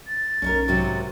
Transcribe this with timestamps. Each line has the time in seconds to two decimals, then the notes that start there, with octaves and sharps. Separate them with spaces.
0.07 A6
0.42 B1 C#4 D#4 A#4
0.68 G#2 C3 F#3